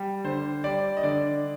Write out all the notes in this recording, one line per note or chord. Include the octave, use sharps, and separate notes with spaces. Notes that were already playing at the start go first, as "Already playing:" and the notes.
Already playing: G3
D3 C5
G3 D5
D#5
D3 D5